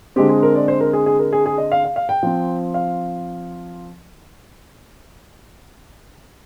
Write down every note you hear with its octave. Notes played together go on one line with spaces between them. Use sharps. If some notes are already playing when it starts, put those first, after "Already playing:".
D3 G#3 C4 G4
G#4
A#4
D5
C5
A#4
G#4
G#4
A#4
G#4
G#4
D#5
F5
F5
F5
G5
F3 C4
F5